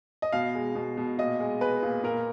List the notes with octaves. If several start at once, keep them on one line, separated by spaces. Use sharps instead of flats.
D#5
B2 F5
G#3
B2
B2
A#2 D#5
G#3
G#3 B4
A#2
A#2 A#4